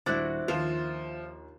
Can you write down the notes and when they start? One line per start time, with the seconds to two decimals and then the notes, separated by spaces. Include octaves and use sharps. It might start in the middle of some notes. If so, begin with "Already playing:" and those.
0.06 D#1 D4 E4 F#4 C5 E5 F#6 A6
0.48 D#2 F3 F4